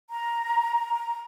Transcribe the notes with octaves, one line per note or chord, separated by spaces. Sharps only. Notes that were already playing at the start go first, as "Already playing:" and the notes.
A#5